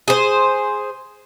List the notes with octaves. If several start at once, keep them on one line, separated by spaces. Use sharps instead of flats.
G#4 C5